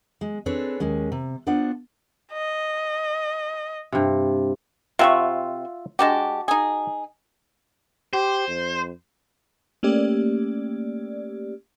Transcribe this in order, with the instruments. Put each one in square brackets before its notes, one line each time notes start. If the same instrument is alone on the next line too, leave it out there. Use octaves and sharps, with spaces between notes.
[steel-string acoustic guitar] G#3
C4 D4 G#4 A4 B4 C#5
D#2 G#3 C#4
C3
B3 D4 F4 C5 F#5
[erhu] D#5
[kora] G2 C3
[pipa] C3 C4 C#6 [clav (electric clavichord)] F4 E5 F#5
[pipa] G#3 D4 G4 [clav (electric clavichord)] F#4 A5
[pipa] D#4 G#4
[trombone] G4 [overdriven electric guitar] C5
[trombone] F2
[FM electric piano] A3 A#3 C#4 G4 D5